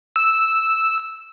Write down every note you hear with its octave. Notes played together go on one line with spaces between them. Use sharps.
E6